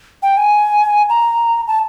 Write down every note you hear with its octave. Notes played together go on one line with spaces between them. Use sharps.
G5
G#5
A#5
A5